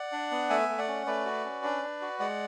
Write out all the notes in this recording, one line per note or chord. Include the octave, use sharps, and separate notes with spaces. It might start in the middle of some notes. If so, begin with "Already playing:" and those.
Already playing: D5 F#5
D4
B3
A3 E5 G#5
A3
D5 F#5
C#4
A3 B4 D5
F#4
C#4
D4
D4
F#4
G#3 D5 F#5